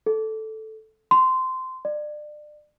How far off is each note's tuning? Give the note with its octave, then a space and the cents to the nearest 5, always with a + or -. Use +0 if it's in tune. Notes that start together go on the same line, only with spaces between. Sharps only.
A4 -5
C6 -15
D5 +30